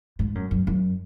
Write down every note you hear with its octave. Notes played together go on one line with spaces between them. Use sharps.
G#2
F#2
F#2
F#2